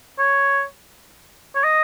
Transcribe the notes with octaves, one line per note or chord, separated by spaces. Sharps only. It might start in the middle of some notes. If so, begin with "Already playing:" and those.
C#5
C#5
D#5